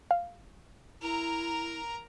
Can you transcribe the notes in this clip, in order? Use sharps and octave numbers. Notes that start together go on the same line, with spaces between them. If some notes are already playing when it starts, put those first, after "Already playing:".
F5
E4 A#4 A#5